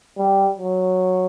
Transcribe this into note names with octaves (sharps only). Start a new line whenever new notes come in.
G3
F#3